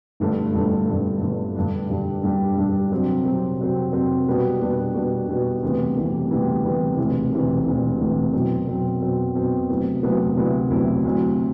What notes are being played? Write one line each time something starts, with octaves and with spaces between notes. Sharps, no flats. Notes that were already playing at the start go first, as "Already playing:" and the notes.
G1 G2 D3 A3
G1 G2 D3 A3
G1 G2 D3 A3
G1 G2 D3 A3
G2 D3 G3 D4
G2 D3 G3 D4
G2 D3 G3 D4
G2 D3 G3 D4
C3 F#3 C4
C3 F#3 C4
C3 F#3 C4
C3 F#3 C4
B2 G3 B3 D4 F#4
B2 G3 B3 D4 F#4
B2 G3 B3 D4 F#4
B2 G3 B3 D4 F#4
D2 C3 E3 G3 B3
D2 C3 E3 G3 B3
D2 C3 E3 G3 B3
D2 C3 E3 G3 B3
E1 D2 C3 E3
E1 D2 C3 E3
E1 D2 C3 E3
E1 D2 C3 E3
B2 F#3 C4
B2 F#3 C4
B2 F#3 C4
B2 F#3 C4
D2 C3 F#3 B3 E4
D2 C3 F#3 B3 E4
D2 C3 F#3 B3 E4
D2 C3 F#3 B3 E4
D2 C3 F#3